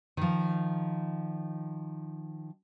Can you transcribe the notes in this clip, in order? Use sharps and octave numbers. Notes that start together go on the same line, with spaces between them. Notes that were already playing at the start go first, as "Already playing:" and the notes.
D#3 F3